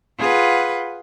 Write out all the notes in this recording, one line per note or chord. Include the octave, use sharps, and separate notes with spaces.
F4 G#4 B4 F#5